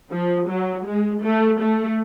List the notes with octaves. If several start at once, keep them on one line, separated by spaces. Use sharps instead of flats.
F3
F#3
G#3
A3
A3